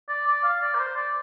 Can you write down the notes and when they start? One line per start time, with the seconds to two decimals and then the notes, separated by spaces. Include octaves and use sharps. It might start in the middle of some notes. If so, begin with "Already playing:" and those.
0.08 D5
0.26 D5
0.43 F5
0.62 D5
0.74 A#4
0.79 C5
0.96 D5